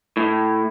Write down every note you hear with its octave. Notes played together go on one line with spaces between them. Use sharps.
A2